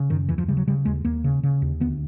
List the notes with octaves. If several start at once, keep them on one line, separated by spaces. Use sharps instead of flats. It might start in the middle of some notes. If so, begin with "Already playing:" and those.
Already playing: C#3
F#2 D#3
D#2 E3
F3
C#3 G3
F#3
C#3 G3
D#2 G#3
D#2 A#3
C#3
C#3
D#2
D2 B3